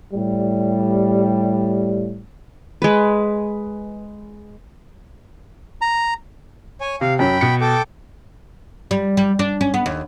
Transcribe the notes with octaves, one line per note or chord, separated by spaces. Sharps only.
A2 G3
G#3 B4
A#5
C#5 G#5
C3 F5
F#2 F#3 G5 B5
B2 C#7
A4 G5 D6
G3
G3
D4
C#4
B3
D#2